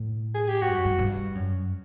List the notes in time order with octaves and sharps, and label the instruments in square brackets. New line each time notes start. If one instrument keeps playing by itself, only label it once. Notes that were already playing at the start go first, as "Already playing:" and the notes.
Already playing: [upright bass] A2
[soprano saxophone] G#4
G4
[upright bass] G#2 [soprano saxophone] F#4
[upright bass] G2
F#2
G2
G2
F#2